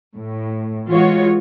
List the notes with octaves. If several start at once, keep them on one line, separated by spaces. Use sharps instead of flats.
A2
E3 G#3 F4 F#4 C#5